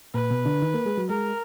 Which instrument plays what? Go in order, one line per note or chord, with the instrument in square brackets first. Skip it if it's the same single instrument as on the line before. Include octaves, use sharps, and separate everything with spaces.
[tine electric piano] A#2 A#3 [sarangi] B4
[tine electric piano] B2 B3
D3 D4
D#3 D#4
A#3 A#4
G#3 G#4
F#3 F#4
[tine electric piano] G#3 G#4 [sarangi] A#4